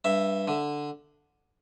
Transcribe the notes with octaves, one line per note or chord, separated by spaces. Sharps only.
G2 E5
D3